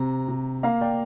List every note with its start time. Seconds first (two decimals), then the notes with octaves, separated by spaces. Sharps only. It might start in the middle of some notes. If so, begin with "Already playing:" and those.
Already playing: C3 A#5
0.28 C3
0.63 A#3 F5 A#5
0.81 D5 G5